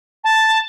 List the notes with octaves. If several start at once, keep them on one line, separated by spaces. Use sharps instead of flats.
A5